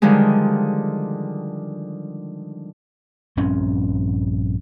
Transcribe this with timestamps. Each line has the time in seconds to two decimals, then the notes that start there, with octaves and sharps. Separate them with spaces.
0.02 D3 D#3 F3 G3 G#3
3.37 A#1 G2 C4 C#4